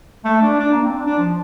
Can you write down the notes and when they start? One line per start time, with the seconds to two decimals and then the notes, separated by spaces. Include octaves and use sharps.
0.25 A3
0.42 D4
0.59 D4
0.72 A#3
0.84 C4
0.95 D4
1.06 D4
1.18 F3